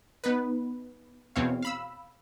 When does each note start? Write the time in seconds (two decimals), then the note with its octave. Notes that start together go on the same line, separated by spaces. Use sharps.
0.24 B3 D#4 B4
1.36 E2 B2 C4 C#5 F5
1.62 F5 B5 E6